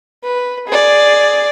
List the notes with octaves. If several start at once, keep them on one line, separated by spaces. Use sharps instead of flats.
B4
G#4 D5